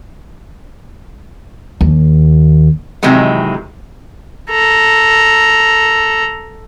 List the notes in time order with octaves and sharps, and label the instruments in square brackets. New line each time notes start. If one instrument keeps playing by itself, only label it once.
[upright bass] D#2
[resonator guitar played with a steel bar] C3 D#3 E3 F#3 G#3
[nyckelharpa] A4 A#5